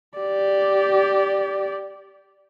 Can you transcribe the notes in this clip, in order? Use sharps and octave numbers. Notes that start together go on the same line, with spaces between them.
G4 D5